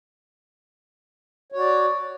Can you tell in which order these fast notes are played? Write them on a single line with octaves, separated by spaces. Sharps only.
C#5 F#4 D5